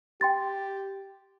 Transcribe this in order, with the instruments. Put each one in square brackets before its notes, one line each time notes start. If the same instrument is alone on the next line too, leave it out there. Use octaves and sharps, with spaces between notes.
[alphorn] G4 [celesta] G5 C6 A6